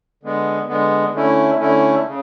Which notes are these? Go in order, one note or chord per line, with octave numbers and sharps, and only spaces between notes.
D3 G#3 B3
D3 G#3 B3
D3 A3 C#4 E4
D3 A3 C#4 E4
C#3